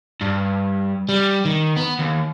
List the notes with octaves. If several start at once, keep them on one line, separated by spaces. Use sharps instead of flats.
G2
G3
D#3
B3
D#2